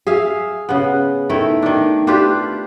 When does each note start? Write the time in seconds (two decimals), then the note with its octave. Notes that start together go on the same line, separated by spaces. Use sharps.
0.07 G#4 E5 F5
0.69 C#3 B3
1.29 D#3 A3 E4
1.62 D#3 D4
2.07 D4 F4 G4 B4